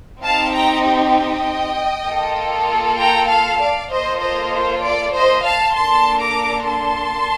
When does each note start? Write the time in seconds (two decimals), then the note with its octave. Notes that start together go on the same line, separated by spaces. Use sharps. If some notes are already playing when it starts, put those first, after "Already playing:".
0.23 C4 D#4 G4 F5 A5
0.54 G5 A#5
0.84 D#5 G5
2.07 A#3 F4 A4
3.00 G5 A#5
3.30 F5 A5
3.61 D5 F5
3.92 A#3 F4 A4 C5 D#5
4.23 C5 D#5
4.54 C5
4.84 D5
5.15 C5 D#5
5.45 F5 A5
5.76 A#3 D4 A4 A5 C6
6.22 A#5 D6
6.68 A5 C6